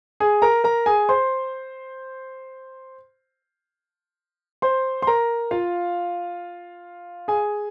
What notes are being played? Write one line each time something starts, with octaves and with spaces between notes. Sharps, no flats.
G#4 G#5
A#4 A#5
A#4 A#5
G#4 G#5
C5 C6
C5 C6
C6
A#4 A#5
F4 F5
G#4 G#5